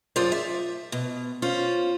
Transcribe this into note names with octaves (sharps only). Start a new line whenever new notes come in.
F#2 F4 G#4 C5 D5
E5
B2
C#4 F4 C5